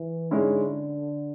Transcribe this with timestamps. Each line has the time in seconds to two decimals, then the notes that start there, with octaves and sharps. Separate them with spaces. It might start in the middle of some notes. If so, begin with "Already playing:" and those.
Already playing: E3
0.31 G#2 D3 G#3 C#4 E4